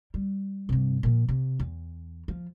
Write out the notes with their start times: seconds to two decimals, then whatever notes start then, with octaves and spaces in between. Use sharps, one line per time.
0.14 G3
0.69 G2 C3
1.03 A#2 F3
1.29 C3
1.59 E2
2.28 F3